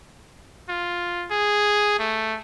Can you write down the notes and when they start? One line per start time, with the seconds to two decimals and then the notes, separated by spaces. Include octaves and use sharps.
0.69 F4
1.31 G#4
1.99 A3